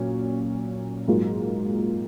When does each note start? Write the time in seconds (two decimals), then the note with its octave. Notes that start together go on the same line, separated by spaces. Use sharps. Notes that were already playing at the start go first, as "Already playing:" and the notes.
Already playing: A#2 F#3 C#4
1.08 G#2 F#3 A#3 F4